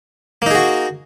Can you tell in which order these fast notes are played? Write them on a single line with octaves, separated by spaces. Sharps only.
A#3 D#4 G#4 F#4